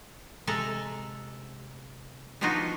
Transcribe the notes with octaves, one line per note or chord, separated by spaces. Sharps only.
C3 G#3 A4 A#5
F3 B3 D4 D#4 F4 F#4